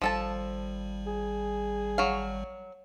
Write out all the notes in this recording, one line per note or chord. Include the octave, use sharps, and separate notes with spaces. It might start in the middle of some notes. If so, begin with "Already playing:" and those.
G#1 F3 G3 A4 A5
G#4
F#3 F5